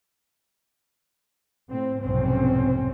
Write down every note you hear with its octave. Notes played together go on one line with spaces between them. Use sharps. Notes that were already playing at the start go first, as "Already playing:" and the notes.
A2 C4
B1 F2 G#2 C3 C4 C#4